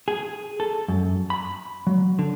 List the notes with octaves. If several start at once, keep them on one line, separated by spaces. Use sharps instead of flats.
G#4
A4
F#2
B5
F#3
D3